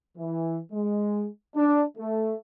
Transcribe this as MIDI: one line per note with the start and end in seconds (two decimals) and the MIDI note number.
0.17 0.59 52
0.72 1.27 56
1.55 1.83 62
1.98 2.36 57